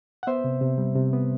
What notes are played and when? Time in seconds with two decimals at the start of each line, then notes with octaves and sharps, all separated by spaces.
0.23 F#5
0.27 B3 C5 E5
0.44 C3
0.61 C3
0.78 G3
0.95 C3
1.13 B3